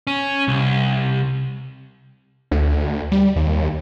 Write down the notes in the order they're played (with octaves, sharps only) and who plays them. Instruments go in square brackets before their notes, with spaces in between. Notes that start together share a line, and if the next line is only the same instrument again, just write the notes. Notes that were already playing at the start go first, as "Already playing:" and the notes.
[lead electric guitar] C#4
C2
[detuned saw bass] D2
G3
D#2